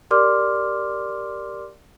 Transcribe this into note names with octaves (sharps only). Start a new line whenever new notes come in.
G4 A#4 D5 C6 D6 F6